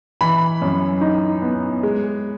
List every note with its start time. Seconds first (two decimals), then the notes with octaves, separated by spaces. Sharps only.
0.21 E3 B5
0.62 F#2
1.01 D#4
1.42 B3
1.83 G#3